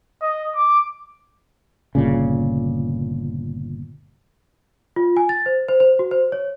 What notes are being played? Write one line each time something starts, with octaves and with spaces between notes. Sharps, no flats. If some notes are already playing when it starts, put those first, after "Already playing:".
D#5
D6
G1 A#2 C#3
F4
G#5
A6
C5
C5
C5
F#4
C5
C#5